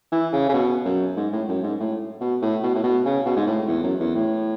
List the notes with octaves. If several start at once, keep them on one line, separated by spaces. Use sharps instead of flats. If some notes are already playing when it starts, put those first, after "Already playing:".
E3
C#3
C#3
B2
F#2
G#2
A2
F#2
G#2
A2
B2
A2
B2
A2
B2
C#3
B2
G#2
A2
E2
F#2
E2
A2